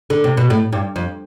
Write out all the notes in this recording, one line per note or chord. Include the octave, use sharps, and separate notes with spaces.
D3
C3
B2
A2
G2
F2